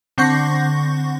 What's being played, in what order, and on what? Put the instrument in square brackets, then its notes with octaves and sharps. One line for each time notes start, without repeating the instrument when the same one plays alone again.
[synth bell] D3 C4 F#5 C#6 G6 A#6